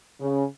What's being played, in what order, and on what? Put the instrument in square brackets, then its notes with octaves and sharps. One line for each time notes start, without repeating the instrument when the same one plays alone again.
[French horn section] C#3